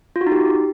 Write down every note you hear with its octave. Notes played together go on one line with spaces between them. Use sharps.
F4
F#4
D#4
G4